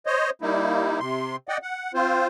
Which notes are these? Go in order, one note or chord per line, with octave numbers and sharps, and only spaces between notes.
C5 C#5 D#5
G3 A#3 D#4 E4
C3 C6
D5 D#5 F#5 G5
F#5
C4 F4 C5